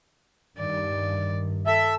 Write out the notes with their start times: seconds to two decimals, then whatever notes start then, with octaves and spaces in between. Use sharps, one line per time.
0.59 G2 D#3 D5
1.66 A4 E5